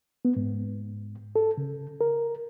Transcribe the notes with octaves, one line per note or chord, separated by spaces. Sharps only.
B3
G#2
A4
C#3
A#4